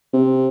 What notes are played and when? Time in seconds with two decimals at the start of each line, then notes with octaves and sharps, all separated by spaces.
0.13 C3